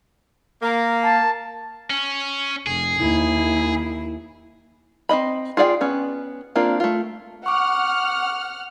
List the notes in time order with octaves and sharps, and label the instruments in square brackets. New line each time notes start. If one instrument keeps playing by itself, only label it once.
[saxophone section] A#3
[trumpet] A5
[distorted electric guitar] C#4
[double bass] F1 [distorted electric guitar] G#4
[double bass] D#2 [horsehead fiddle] E4
[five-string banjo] C4 D4 D#5 B5
F4 G#4 D5 F#5 G5
B3 C#4
A#3 C4 D4 F4
A3 F4
[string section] F#5 F6 [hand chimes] C#6 D6